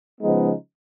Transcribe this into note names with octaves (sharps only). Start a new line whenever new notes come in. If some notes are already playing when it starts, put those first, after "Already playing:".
C#3 F3 G#3 B3 D#4